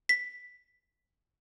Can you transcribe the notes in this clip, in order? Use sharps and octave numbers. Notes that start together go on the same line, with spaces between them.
B6